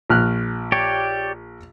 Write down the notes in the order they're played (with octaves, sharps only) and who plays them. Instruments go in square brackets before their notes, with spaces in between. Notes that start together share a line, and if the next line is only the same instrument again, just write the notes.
[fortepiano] A#1 F6 F#6
[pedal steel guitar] G4 C#5 D5